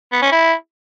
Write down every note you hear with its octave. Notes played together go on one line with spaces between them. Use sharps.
B3
C#4
E4